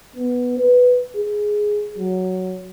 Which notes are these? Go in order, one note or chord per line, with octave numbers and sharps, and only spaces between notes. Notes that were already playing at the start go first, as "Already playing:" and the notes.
B3
B4
G#4
F#3